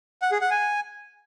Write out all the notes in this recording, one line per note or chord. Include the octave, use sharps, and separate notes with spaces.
F#5
G#4
F#5
G#5